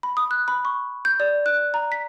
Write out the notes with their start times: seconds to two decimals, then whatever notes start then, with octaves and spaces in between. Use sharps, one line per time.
0.03 B5
0.17 D#6
0.31 F#6
0.48 B5
0.65 C#6
1.05 G6
1.20 D5
1.46 F#6
1.74 A#5
1.92 B6